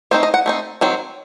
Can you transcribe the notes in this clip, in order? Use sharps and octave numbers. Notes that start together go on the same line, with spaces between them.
A3 C4 D#4 C5
D#5
F#5
A3 C4 D#4
D#3 F#3 C4